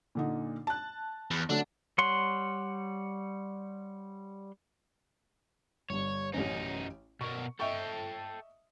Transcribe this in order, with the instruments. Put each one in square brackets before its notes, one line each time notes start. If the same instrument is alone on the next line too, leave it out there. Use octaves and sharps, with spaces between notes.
[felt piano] A#2 D3 D#4
A5 F#6
[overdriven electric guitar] E2
[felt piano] D3 F#3 A3 [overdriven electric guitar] D4
[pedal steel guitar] G3 C#5 F#5 C6
[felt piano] G1 G2 [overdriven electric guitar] C#5
[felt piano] A1 C#4 [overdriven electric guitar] F#2 D#4
[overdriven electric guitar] B2 A#4 [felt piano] C#6
[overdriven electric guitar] A4 G5 [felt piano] D#5 E5 C#6